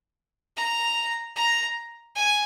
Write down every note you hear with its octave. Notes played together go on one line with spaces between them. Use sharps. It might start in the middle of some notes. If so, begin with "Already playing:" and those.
A#5
A#5
G#5